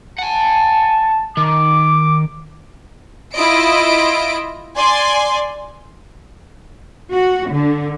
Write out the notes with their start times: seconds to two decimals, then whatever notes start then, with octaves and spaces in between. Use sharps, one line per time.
0.19 F#5 G#5 A5
1.37 D#3 D6
3.35 E4 F4 D#5 D7
4.77 D5 G#5 C6
7.13 F#4
7.51 D3